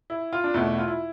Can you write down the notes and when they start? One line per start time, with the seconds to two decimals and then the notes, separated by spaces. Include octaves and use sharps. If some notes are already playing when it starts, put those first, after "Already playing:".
0.10 E4
0.33 F4
0.44 D4
0.54 E2 B2 A3 E4
0.78 F4
0.88 E4